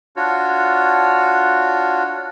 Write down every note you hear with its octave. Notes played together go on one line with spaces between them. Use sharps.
D4 F4 F#4 C#5